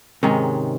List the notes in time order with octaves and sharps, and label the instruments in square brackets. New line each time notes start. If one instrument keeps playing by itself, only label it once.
[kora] G#2 D#3 G#3 C#4 [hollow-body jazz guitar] C3